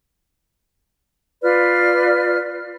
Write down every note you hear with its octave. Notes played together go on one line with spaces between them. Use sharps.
F4 B4 D5 F6